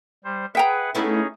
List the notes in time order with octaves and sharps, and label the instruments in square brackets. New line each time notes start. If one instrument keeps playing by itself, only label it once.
[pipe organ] G3 C5
[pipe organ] G#4 B4 F#5 [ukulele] E5 G5 A#5
[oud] A3 B3 E4 [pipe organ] C#4 D#4 G#4